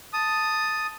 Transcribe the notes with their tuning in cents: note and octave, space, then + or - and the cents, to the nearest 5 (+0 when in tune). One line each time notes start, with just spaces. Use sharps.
A5 +0 D#6 +0